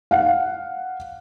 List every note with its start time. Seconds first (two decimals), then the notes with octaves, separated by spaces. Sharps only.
0.11 F5 F#5